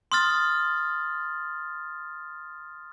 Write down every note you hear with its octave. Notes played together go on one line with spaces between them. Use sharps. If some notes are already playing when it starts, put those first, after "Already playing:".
C6 D#6 F6 A6